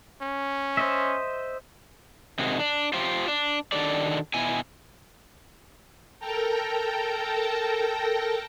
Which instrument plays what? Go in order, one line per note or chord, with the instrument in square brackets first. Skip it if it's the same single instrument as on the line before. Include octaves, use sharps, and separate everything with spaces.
[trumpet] C#4
[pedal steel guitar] C5 D#5 E5
[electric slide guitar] C3 D#3 G#3 F#4
D4
F4 G4 C5
D4
D#3 D4 F#4 G4 A4 D5
B2 E4 G#5
[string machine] A4 A#4 G5 A5 A#5